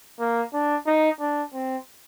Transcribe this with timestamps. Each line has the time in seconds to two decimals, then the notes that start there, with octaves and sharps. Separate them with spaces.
0.20 A#3
0.53 D4
0.86 D#4
1.20 D4
1.53 C4